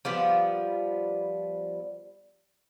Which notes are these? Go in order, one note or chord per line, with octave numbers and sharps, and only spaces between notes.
F3 G3 B3